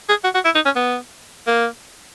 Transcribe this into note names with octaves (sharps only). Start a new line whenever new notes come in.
G#4
F#4
F#4
E4
D#4
C#4
B3
A#3